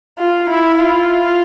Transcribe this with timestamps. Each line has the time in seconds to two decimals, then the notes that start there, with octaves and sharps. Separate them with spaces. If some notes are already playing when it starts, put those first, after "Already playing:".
0.18 F4
0.49 E4
0.79 F4